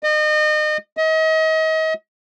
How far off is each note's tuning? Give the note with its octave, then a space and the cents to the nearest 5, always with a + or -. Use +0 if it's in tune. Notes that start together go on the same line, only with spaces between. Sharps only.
D#5 -35
D#5 +35